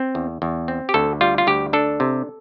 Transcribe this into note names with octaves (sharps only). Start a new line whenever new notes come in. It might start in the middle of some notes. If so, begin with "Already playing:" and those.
Already playing: C4
E2
E2
C4
G4
D2 A4
G3 F4
F4
D2 G4
D4 A4
C3